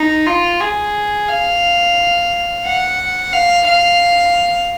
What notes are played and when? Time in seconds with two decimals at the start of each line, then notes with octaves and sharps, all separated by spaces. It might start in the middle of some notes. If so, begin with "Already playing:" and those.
Already playing: D#4
0.27 F4
0.61 G#4
1.29 F5
2.65 F#5
3.32 F5
3.66 F5